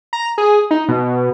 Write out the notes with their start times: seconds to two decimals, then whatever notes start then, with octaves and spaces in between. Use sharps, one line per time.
0.13 A#5
0.38 G#4
0.71 D#4
0.88 B2